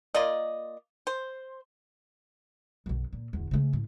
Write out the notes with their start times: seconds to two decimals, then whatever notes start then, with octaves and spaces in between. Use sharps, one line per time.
0.15 A#3 F4 D5 D#5
1.07 C5
2.86 B1 F#2
3.13 A#2
3.33 D1 E2
3.51 C#3 A3
3.73 A2